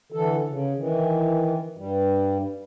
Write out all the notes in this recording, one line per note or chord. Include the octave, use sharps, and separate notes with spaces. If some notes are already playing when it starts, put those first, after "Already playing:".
D3 E3 A4
C#3
D#3 E3
G2 G3